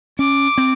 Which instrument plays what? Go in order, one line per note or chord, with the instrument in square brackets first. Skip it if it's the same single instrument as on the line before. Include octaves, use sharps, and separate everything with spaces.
[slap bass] C#4 [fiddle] D6
[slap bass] C4